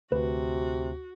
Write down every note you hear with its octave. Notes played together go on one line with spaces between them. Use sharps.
D2 C3 F#4 B4